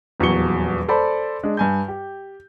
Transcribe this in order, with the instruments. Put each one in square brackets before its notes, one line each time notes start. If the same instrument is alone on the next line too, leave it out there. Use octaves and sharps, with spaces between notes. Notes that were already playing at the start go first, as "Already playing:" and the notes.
[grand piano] D#1 E2 F#3 F#4 C#7 G7
A4 C5 D5 A5 B5
G#3 D4
G2 G#5 G6
G4